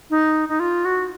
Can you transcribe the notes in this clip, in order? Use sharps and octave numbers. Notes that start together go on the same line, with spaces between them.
D#4
D#4
F4
F#4